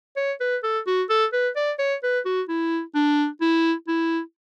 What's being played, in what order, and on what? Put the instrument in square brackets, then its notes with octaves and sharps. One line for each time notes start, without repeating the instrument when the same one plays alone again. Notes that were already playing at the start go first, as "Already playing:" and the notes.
[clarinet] C#5
B4
A4
F#4
A4
B4
D5
C#5
B4
F#4
E4
D4
E4
E4